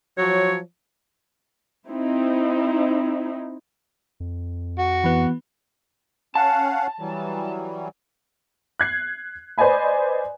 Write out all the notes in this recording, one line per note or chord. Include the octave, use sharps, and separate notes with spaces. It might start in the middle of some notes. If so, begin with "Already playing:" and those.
F3 F#3 C#5
C4 D#4 E4
F2
F#4
E3 B3
C#4 F5 F#5 A5
E3 F#3 G3
F#6 G#6 C7
B4 C5 D5 D#5 G#5 B5